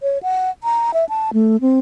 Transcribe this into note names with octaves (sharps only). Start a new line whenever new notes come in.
C#5
F#5
A#5
E5
A5
A3
C4